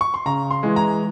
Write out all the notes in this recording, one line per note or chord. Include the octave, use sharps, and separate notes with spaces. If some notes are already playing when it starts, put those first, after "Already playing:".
C#6
C6
C#3 A#5
C6
E3 G#3
A#5